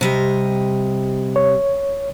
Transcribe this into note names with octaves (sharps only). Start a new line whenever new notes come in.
C3 G3 D#5
C#5